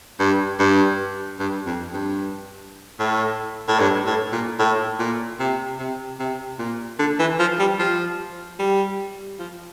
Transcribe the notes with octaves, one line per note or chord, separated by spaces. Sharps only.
G2
G2
G2
F2
G2
A2
A2
G2
A2
A#2
A2
A#2
C3
C3
C3
A#2
D3
E3
F3
G3
F3
G3
F3